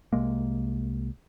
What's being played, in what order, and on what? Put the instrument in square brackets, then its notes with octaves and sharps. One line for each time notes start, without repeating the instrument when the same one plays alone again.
[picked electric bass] C2 C3 G#3 A#3